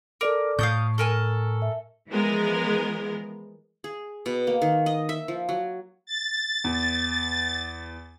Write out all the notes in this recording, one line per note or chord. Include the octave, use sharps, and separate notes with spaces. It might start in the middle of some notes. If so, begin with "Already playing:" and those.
A4 A#4 D5 D6
A2 F5 C#6 D#6 G6
A4 A#4 G#5
E5
E3 F3 G#3 B3 A#4
G#4
B2
A#3
D#3
D#5
E5
F3
F#3
A6
E2